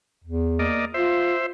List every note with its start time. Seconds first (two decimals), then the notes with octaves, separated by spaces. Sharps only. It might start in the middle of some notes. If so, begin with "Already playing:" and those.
0.24 E2
0.59 A#3 D5 D#5
0.94 F4 C5 E5